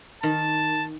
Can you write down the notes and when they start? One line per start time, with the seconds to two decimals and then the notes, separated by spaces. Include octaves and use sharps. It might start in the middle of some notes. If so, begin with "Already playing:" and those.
0.23 D#3 A5